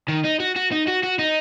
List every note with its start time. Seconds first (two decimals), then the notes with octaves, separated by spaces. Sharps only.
0.08 D#3
0.25 D#4
0.40 F#4
0.56 F#4
0.71 D#4
0.87 F#4
1.03 F#4
1.19 D#4